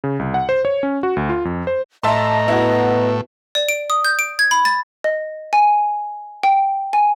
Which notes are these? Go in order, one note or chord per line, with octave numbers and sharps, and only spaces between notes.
C#3
C2
F#5
C5
C#5
C#4
F#4
D2
F4
F2
C5
A2 D#5 E5 A5 A#5 C6
B3 E4 F#4
D5
D7
D#6
G6
D7
G#6
B5
A6
D#5
G#5
G5
G#5